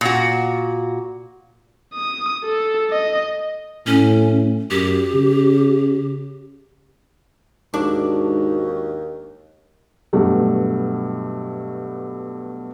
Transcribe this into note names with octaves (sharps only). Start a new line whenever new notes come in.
A#2 F#4
D#6
A4
D#5
A2 C#4
F#2 G4
C#3
D#2 G#2 D4 F#4
G2 B2 F#3 A3